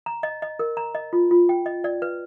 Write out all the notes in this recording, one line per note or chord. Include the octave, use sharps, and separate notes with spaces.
A#5
D#5
D#5
A#4
A#5
D#5
F4
F4
G5
D#5
D5
B4